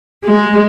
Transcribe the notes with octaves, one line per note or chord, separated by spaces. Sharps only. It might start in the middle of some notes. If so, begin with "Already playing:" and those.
G#3